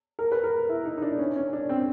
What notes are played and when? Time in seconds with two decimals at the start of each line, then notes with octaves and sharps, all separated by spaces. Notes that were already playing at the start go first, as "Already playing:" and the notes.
0.19 A#4
0.32 B4
0.44 A#4
0.69 E4
0.85 D#4
0.97 D#4
1.02 D4
1.19 C#4
1.36 C#4
1.53 D4
1.69 C4